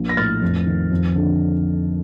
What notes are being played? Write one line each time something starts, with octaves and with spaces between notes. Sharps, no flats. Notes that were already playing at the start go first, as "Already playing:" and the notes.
Already playing: A#1
A#6
A2 F6 A6
F2
D#3
F2
D3